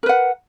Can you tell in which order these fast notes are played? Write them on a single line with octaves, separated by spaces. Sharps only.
A#4 B4 F#5